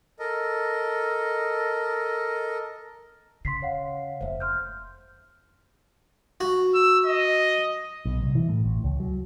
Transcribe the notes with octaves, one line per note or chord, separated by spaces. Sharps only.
A4 A#4 D#5
C#3 C6 B6 C7
C#5 F5 F#5
F1 A#3 C5 E5
C6 F6 G6
F#4
E6
D#5
B1
C2
E3
A2
A1
C#2
F#3